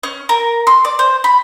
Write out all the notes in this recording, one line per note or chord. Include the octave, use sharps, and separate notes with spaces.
C#4
A#4
C6
D5
C5
B5